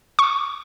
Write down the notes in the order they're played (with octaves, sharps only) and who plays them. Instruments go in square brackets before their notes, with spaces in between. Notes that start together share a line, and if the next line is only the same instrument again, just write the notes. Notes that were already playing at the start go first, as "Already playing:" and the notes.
[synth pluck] C#6